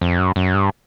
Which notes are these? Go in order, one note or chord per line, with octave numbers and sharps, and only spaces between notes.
F2
F#2
F#2
G2